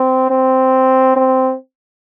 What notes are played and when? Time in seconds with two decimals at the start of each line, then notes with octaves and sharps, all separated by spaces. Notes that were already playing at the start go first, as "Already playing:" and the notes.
Already playing: C4
0.30 C4
1.16 C4